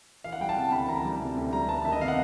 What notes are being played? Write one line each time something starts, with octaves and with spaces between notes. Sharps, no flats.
E3 F5
F#5
G3 G5
A5
C3
D2 B5
E3 A#5
G3
C3
D2
G3 A#5
B3 A5
D#3 E5
D#5
C3 F5
F#5